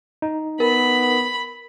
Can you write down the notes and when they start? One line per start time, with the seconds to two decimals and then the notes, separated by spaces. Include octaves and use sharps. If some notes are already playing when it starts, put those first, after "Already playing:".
0.22 D#4
0.60 B3 A#4 B5